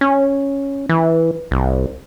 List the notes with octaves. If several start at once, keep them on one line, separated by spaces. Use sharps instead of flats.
C#4
E3
C2